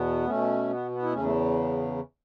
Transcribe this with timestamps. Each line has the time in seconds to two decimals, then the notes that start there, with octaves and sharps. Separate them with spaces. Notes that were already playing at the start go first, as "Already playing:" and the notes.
Already playing: E2 B2 B3
0.25 B2 A3 C#4
0.69 B3
0.91 B3
1.02 E4
1.13 E2 C#3 A3 C#4
1.24 A3